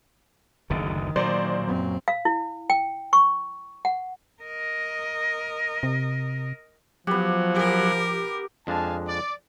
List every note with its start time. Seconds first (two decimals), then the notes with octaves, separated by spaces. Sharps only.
0.70 F#1 D2 D3 D#3
1.16 A#2 F#3 C5 D5
1.64 F#2 C4
2.08 F5
2.25 E4
2.70 G5
3.13 C#6
3.85 F#5
4.43 A#4 D#5
5.83 C3
7.07 F3 F#3 B3 G4
7.56 G4 A#4
8.67 F2 G#3 D4 F5 G#5 A5
9.08 D5